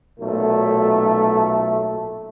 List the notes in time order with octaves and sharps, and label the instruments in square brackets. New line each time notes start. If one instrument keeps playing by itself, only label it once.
[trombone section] B1 A#2 A3